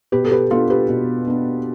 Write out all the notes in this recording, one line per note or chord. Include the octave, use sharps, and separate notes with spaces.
B2 G4 B4
A4
G4 B4
B3 D4 F4 A4
G4 B4
B2
B3 D4